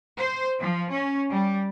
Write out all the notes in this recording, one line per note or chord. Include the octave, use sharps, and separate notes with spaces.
C5
F3
C#4
G3